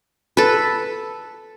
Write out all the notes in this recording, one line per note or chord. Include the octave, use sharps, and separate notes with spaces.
A4 B4